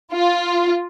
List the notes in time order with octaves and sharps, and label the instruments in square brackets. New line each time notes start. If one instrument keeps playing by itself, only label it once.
[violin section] F4